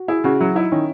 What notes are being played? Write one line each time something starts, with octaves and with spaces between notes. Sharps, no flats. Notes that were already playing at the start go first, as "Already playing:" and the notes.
Already playing: F#4
E4 G#4
C#3 F#4
F#3 E4
D#4 E4
D#3 C#4